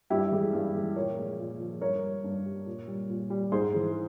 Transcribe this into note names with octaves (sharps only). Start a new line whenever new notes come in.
G2 E4 G4
E3 G#3
G2
E3 G#3
A#2 A#4 C#5
F3 G#3
A#2
F3 G#3
G2 A#4 C#5
G3
G2
G3
A#2
G3
A#2
G3
G#2 G#4 C5
E3 G#3